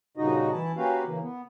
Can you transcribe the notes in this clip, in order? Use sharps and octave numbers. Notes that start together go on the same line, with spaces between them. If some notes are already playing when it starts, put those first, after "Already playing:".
G2 A#2 C#3 D#4 F#4 D#5
E3 E4 A5
A#3 C#4 F#4 G4 B4 F5
C#3 E3 A#3
B3